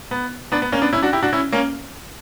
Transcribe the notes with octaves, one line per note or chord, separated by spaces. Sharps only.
B3
B3 D4
B3
A#3 C#4
B3 D4
C#4 E4
D4 F#4
E4 G4
D4 F#4
C#4 E4
A#3 C#4